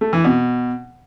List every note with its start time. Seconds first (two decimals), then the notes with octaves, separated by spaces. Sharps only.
0.01 A3
0.13 E3
0.24 B2